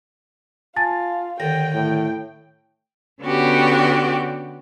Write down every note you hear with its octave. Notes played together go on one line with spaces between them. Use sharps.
F4 G#5 A5 A6
D#2 D3 G5 A#6
A2 G5
D3 B3 C#4 F#4 G4 G5